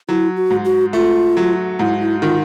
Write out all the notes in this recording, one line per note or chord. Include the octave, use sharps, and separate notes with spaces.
F#3 E4
F#4
G#2
F#4
A3 F4
F#3
G#2 E4
E4
D#3 F4